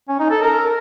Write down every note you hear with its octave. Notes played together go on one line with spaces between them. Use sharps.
C#4
D#4
A4
A#4